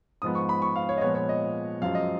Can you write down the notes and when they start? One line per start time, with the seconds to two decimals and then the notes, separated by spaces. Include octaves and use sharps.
0.22 G#2 F3 G#3 B3 D#6
0.35 C#6
0.49 B5
0.62 C#6
0.76 F5
0.89 C#5
0.98 D#5
1.01 A#2 F3 G#3 B3 C#5
1.15 C#5
1.29 D#5
1.82 F#2 F3 G#3 F5
1.95 D#5